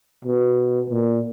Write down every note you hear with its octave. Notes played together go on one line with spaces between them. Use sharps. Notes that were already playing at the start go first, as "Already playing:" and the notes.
B2
A#2